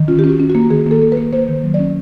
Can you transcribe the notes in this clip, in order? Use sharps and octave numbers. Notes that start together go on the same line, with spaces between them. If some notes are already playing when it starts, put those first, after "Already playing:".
Already playing: D#3
C#4 F4
G4
C#4
F#4
C#4
F#4
A#3
D#3 G#4
A#3 A4
A#3
B4
A#3
A#3 C5
D#3
F#3
D5
C#4